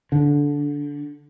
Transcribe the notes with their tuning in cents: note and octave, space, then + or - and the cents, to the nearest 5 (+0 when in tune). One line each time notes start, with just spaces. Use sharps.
D3 -15